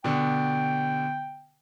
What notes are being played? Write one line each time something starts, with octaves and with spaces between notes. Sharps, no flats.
B2 D3 G5